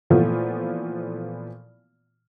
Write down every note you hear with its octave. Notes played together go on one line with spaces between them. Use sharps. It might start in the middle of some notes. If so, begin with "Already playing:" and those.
A#2 E3 F3 A3 B3 F4